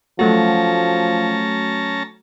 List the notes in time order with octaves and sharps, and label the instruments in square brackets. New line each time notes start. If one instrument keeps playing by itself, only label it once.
[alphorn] F3 [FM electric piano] F#3 A3 F#4 [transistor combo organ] C#4 A5 A#5